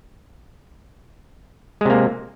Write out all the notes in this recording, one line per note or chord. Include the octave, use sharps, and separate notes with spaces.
C3 G#3 A#3